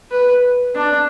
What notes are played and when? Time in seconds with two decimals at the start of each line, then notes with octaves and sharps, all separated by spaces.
0.11 B4
0.75 D4